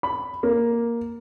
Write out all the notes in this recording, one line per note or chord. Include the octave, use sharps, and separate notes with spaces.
B5
A#3